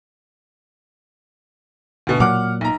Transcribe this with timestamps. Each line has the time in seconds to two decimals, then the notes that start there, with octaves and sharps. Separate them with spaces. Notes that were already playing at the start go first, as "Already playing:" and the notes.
2.07 D2 B2
2.20 A#2 F#3 F#5 D6 F6
2.61 B1 A#5